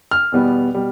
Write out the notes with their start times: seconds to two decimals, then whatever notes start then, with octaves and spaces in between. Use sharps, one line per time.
0.11 F6
0.32 E2 B2 G3 B3
0.75 B2 G3